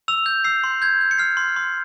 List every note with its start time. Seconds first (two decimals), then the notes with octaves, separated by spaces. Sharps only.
0.08 E6 F7
0.26 G6
0.44 E6 C7
0.64 C6
0.82 G6 G#6
1.01 G6
1.11 C#7
1.18 F6 C7
1.37 C6
1.56 C6